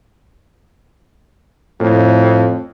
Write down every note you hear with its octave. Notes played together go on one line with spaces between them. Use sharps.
F2 A2